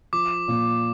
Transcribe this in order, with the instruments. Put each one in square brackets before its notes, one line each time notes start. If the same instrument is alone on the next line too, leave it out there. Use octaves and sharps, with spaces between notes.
[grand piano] F3 [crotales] D6
[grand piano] A#2